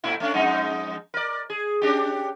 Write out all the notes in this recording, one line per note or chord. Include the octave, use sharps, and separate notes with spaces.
A#2 A3 E4
A3 C#4 D4
F2 G#3 D#4
A#4 D5
G#4
C#4 D4 G4